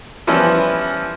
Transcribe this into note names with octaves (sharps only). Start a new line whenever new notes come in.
E3 F3 G3 B3 C#4 E4